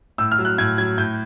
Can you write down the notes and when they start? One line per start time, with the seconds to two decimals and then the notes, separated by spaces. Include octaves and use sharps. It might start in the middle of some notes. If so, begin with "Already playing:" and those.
0.18 A2 E6
0.32 F6
0.39 F#3
0.45 F#6
0.58 A2 G#6
0.78 F#3 G#6
0.98 A2 G6